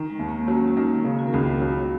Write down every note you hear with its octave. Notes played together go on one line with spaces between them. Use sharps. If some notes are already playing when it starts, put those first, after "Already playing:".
Already playing: D#3
G#3
D#2
A#3
F#3 C#4
A#3
G#3
D#3 A#3
C#3 D#4
F#4
A#4
C#2 G#4
C#5
F#3